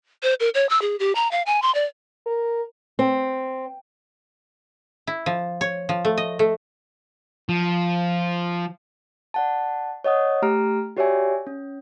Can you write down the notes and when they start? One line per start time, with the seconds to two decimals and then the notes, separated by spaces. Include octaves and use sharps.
0.23 C5
0.40 A#4
0.54 C#5
0.69 E6
0.81 G#4
0.99 G4
1.15 A#5
1.31 F5
1.46 G#5
1.62 C6
1.75 D5
2.27 A#4
2.99 C4
5.07 E4
5.26 F3
5.61 C#5
5.89 F3
6.05 A3
6.17 D#5
6.39 A3
7.49 F3
9.34 D5 F#5 A5
10.04 C#5 D#5 F#5 D#6
10.42 A3 G4 A#5 F6 D7
10.97 F#4 G4 C#5 D5 E5 G#5
11.47 C#4